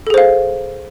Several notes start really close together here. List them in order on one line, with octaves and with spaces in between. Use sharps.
A4 G#4 C5 F5